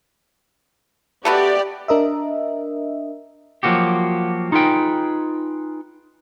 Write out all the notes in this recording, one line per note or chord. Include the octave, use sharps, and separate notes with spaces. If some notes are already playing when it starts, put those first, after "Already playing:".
A3 B3 F#4 G4 D5
D4 A#4 D#5 E5
F3 F#3 A#3 F#4 G4
D#4 F4 G#4 B4 G5